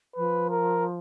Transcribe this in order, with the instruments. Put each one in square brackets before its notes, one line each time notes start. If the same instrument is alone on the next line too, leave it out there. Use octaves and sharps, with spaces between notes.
[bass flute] F3 [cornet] B4
[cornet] A#4